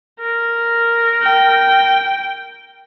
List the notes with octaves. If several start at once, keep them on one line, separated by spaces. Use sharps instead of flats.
A#4
G5